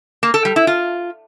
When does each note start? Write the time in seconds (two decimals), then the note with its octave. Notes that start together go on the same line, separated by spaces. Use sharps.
0.23 A#3
0.34 A4
0.45 G3
0.56 E4
0.67 F4